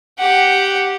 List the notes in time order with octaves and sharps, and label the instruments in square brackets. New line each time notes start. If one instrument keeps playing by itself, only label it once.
[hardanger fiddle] G4 F#5